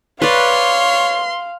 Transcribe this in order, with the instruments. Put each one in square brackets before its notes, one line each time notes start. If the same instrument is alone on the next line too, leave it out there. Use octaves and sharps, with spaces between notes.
[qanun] B4 D5 [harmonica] C#5 [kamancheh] F5 [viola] C6